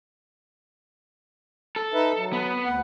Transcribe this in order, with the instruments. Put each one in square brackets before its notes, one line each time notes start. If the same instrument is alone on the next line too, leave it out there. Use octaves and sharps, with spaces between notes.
[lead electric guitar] A4
[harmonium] D#4 B4 E5
F#3
[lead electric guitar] B3
[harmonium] D2 F#5